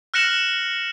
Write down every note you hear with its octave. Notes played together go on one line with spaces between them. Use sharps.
F6 F#6 A#6 C#7 E7 F#7